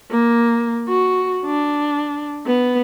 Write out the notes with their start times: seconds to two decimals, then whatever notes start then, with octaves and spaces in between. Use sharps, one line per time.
0.11 A#3
0.88 F#4
1.45 D4
2.46 B3